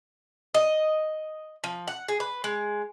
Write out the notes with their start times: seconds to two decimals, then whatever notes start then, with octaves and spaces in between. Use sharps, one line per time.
0.54 D#5
1.64 F3
1.87 F#5
2.08 G#4
2.20 B4
2.44 G#3